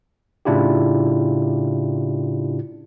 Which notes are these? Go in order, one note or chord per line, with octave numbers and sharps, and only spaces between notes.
A2 C#3 D4 E4 F4 G4